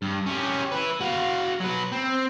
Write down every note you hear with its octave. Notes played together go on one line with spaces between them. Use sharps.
G2
C#4 G4
E4 B4
F#4 F5
F#3 B4
C4